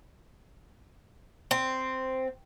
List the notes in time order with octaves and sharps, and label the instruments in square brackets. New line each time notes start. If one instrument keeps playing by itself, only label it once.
[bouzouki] C4